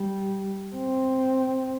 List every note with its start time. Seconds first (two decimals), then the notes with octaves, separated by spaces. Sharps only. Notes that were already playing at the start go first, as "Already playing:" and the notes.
Already playing: G3
0.76 C4